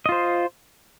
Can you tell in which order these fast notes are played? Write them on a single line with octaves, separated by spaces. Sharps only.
D#5 F4 C5